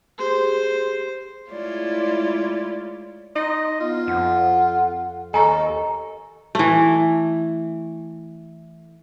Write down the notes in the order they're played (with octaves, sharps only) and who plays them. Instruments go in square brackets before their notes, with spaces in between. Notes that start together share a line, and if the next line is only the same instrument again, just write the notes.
[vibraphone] G4 G#4 [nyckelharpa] C5
[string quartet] G#3 A3 E4 F4 C#5 D5
[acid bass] D#4 [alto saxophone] D#5 [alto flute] C6
[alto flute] B3 [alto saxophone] F4
[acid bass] F2 [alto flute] F#5
[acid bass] D#2 [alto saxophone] A4 [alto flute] D#5 [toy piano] G#5 A#5 C#6
[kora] E3 A3